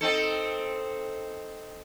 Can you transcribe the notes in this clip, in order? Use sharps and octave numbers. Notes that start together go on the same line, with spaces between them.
C4 D#4 A4